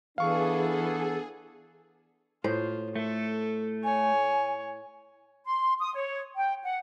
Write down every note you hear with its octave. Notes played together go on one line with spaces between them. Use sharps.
E3 B3 D4 G#4 A4 F5 C#6
A2 F4 C5
A3 A4
C#5 G#5
C6
D#6
C#5
G5
F#5